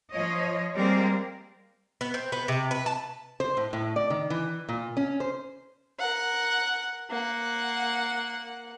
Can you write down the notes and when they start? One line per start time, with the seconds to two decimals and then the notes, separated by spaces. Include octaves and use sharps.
0.12 F3 C#5 D#5
0.75 G3 G#3 A#3 C4 A#4
2.01 B3
2.14 C4
2.32 B3
2.48 C3
2.71 B4
2.86 A5
3.40 C5
3.57 A2
3.73 A2
3.96 D5
4.10 D#3
4.30 E3
4.69 A#2
4.97 C#4
5.20 C5
5.99 A#4 F#5
7.10 A#3 F#5